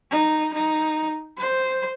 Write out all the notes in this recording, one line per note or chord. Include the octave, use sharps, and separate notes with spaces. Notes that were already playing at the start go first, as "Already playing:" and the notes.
D#4
D#4
C5